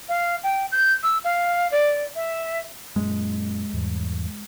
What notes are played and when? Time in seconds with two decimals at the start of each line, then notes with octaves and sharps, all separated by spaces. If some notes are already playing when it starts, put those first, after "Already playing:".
0.09 F5
0.43 G5
0.72 G6
1.03 E6
1.24 F5
1.71 D5
2.16 E5
2.96 F#2 A#2 G#3
3.73 E2 G#2 G3